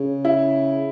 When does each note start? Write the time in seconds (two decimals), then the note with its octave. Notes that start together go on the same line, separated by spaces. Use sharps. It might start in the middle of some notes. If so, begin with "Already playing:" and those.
Already playing: C#3
0.25 E4